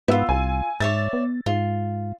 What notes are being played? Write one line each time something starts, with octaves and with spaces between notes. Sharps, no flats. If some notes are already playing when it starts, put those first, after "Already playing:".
G#2 B3 E4 F4 E6
C2 G#5
G#2 C#5 D5 E5 A6
B3
G#2 F4